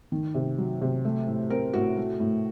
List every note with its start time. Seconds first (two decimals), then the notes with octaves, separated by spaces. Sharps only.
0.12 D#3
0.35 C3
0.58 F#3
0.81 C3
1.05 A3
1.28 A2
1.50 C4 A#4
1.74 A2 F#4
1.97 A3
2.20 A2